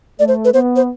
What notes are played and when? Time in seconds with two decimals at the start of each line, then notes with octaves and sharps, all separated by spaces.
0.19 A3 D5
0.28 C5
0.45 B4
0.53 B3 C5
0.76 C5